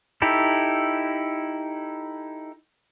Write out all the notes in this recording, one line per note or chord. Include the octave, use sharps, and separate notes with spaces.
D#4 E4 G4 A4